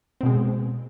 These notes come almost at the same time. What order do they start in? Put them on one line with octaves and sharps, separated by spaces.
C4 B2 G#3